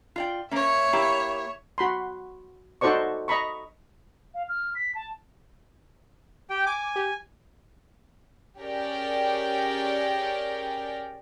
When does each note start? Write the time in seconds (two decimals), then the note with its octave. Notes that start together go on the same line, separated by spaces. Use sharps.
0.16 F4 D5 G5
0.51 A#3 C#4 C#5 E5
0.93 A#3 E4 G4
1.78 F#4 B5 C6
2.81 D#4 F#4 A4 C5 D5 C#6
3.28 D#5 A#5 B5 C#6
4.34 F5
4.49 F6
4.75 B6
4.95 A5
6.50 G4 G5
6.66 G#5 D6
6.96 G4
8.59 C#4 G4 G#4 A#4 D5 G5